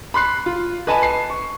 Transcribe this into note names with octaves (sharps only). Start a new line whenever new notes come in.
B5 C6 F#6 C7
F4
B4 D#5 G#5 A5 B5
C7
C#6